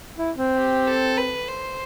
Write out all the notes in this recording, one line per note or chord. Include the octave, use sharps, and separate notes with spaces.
E4
C4
G4
A4
B4
C5